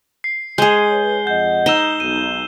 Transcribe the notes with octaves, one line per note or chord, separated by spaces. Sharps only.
C7
G#3 G#4 G6 G7
B4 C#5
F2 D#5 F#5 G6
D#4 E6 E7 G7
B1 D#7